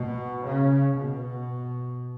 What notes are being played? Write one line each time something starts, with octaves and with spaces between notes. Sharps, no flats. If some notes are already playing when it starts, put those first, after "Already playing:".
Already playing: B2
C#3
B2